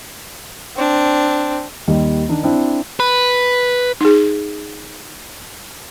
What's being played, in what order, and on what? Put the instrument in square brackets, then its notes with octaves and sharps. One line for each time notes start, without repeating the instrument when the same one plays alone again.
[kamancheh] C4 D4
[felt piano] D#2 D#3 G3
D#3 D4 D#4
C4 D4 E4
[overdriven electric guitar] B4
[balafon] D#4 G#4